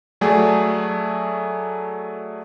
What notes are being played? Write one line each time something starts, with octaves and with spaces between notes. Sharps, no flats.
F#3 A3 G#4 D5